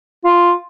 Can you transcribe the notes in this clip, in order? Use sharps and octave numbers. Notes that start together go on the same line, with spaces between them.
F4